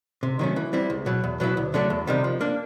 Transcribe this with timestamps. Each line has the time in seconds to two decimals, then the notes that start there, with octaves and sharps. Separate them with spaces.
0.23 C3
0.39 D#3 F#3 A3 C#4
0.56 E3
0.73 G3 C4 E4
0.90 C#2
1.06 B2 F#3
1.24 E2
1.40 B2 F#3 B3 E4
1.57 D2
1.74 D3 F#3 A3 D4
1.90 E2
2.07 C3 D#3 G3
2.24 F3
2.41 A#3 D4